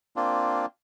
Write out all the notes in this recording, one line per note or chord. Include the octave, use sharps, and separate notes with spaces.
A#3 C4 D4 F4